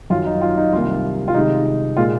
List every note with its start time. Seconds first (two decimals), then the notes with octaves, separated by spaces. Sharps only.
0.10 F#2 D#3 F#3 F4
0.26 D#4
0.41 F4
0.57 D#4
0.73 C2 C3 D#3 A#3 F4
1.28 F4
1.34 C2 C3 D#3 G#3 D#4
1.97 A#2 G#3 F4